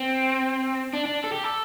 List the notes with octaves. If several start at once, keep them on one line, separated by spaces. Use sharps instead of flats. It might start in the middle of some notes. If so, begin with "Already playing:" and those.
Already playing: C4
D4
D4
A4
G4
A4